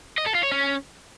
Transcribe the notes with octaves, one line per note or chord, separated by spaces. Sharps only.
D#5
A4
F4
C#5
C#4